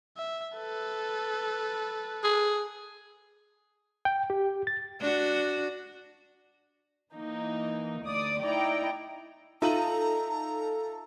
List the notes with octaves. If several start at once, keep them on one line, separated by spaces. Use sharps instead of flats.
E5
A4 B4
G#4
G5
G4
A6
D4 F#4
E3 A#3 D#4
D2 D5 D#6
D#4 E4 D5 G5 A#5
D#4 F4 A4 E5 A#5 D#7 F#7